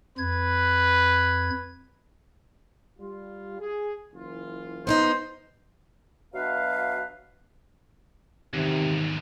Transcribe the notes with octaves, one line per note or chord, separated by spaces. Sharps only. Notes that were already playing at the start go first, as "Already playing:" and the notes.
F2 B4 G#6
G3 F4
G#4
F#1 E3 F4
B3 D4 D#4 C5
B2 F#3 D4 B4 E5 F5
E2 G#2 C3 D#3